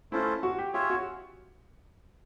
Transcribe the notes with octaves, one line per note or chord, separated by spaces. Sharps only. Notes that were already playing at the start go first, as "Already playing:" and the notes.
A3 C#4 E4 F4 A4 C5
F#4
G4
F4 G4 G#4 C#5 E5
F#4